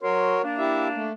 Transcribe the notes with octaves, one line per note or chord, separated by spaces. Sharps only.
F#3 F#4 A#4 C#5 C6
A#3 D4
E4 G4 E5
A3